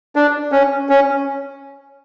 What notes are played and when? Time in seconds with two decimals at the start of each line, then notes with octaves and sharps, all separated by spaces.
0.16 D4
0.52 C#4
0.89 C#4